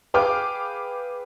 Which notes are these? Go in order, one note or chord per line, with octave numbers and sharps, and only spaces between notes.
G#4 B4 F5 G5 D6 F6